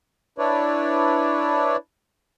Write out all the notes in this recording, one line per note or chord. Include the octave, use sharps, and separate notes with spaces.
D4 E4 B4 C#5 D5